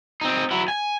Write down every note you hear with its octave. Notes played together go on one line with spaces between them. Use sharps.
C4 D#4
F#3 E4
G#5